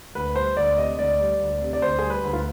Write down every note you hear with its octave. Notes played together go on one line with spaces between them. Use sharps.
D2 B4
G3 C5
D2 D5
C3 D#5
D2 D5
G3
D2
C3
D5
D2 C5
G3 G#4
B4
D2
F4